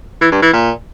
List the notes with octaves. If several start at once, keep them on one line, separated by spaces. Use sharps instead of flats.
E3
G2
E3
A#2